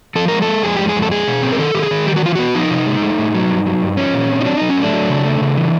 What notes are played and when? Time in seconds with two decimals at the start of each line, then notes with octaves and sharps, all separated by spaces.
0.15 F3 A4
0.28 G#3 A#4
0.42 A4
0.48 G#3
0.63 F2 G#4
0.76 G#3 G4
0.89 G#4
0.96 F2
1.02 A4
1.12 G#3 G#4
1.27 B2
1.43 C4
1.52 A#4
1.59 D#3 A4
1.75 D#3 G4
1.82 G#4
1.91 D#3
2.07 G3 G4
2.16 F#4
2.23 E3 F4
2.35 B3 F#4
2.55 F3 D#4
2.71 C3
2.86 G#3
3.02 A3
3.18 A2
3.34 F#3
3.50 G2
3.66 F#3
3.82 G2
3.97 F3 C#4
4.14 A#2
4.30 C4
4.41 D#4
4.45 F#3 D4
4.57 F#3 D#4
4.69 C#4
4.77 A3 D4
4.93 F#3
5.09 C#3
5.25 A3
5.41 C#3
5.57 E3